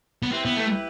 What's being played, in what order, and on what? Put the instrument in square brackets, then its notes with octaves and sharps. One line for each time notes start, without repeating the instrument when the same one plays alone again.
[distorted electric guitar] B3
[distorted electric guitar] C4 [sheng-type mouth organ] E4 G4 B4
[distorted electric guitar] B3
A3